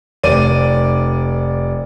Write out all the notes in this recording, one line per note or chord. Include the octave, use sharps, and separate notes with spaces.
F1 D5 D#7